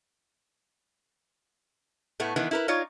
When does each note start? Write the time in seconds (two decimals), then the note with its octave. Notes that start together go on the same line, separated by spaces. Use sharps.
2.20 A2 A3 B3
2.36 D#3 E3 B3
2.51 E4 A#4 B4
2.68 D#4 F4 C#5 D5